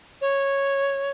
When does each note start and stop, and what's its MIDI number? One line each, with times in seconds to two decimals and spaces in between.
0.21 1.11 73